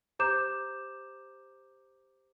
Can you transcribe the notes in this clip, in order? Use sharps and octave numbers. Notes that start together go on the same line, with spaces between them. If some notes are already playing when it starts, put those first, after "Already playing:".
G4 C5 A#5 D6 G6 E7